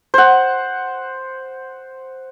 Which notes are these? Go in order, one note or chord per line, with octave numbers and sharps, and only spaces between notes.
C5 F#5